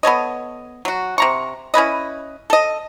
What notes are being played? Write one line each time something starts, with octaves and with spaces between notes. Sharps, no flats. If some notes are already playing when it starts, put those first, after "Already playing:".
B3 A4 C#5 D#5
F#3 F#4
C3 A#5 C#6
C#4 E4 B4 D#5
A4 D#5